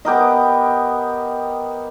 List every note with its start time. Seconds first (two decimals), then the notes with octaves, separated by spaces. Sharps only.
0.05 B3 G4 A#4 D#5